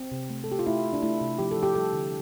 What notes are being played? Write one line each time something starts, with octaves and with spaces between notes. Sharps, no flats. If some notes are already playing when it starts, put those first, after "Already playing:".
Already playing: C4
C3
A3
A4
A3 G4
F4
A3 E4
A3
D4
A3 E4
C3
F3 G4
A4
F3
G4
G3 A4
D3